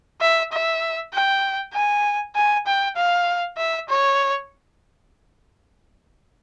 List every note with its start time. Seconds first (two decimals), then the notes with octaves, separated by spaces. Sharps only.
0.21 E5
0.52 E5
1.13 G5
1.74 G#5
2.36 G#5
2.67 G5
2.96 F5
3.58 E5
3.89 C#5